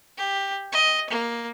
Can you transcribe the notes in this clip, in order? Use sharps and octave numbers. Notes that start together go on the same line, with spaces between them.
G4
D#5
A#3